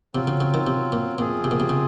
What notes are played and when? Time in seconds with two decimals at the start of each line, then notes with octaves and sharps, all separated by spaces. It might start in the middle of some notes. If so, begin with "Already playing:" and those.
0.15 C3 F#3 C4 F4
0.27 C#3
0.41 C#3
0.54 D#3
0.67 C3
0.92 A#2
1.18 F#2 A#2 F3 C4 F4 G#4
1.44 C3
1.51 A#2
1.60 C3
1.69 C#3